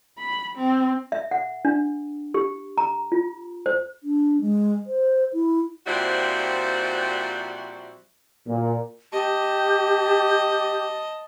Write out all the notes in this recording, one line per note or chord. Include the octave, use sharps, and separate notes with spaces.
B5
C4
E5
F#5
D4
G4
A#5
F4
C5
D4
G#3
C5
E4
A#2 F3 G3 C4 E4 F#4
A#2
G4 D#5 A5